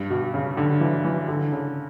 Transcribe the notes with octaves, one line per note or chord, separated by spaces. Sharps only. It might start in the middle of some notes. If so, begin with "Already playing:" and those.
Already playing: G2
B2
C#3
D3
E3
E3
D3
C#3